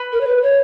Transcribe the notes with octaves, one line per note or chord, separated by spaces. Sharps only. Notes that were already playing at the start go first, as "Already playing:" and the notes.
Already playing: B4
A#4
C#5
B4
C#5